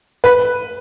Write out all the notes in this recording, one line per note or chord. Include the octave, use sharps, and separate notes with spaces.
B4